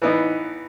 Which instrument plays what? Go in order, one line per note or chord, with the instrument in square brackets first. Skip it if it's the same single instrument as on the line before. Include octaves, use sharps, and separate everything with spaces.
[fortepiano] E3 B3 D#4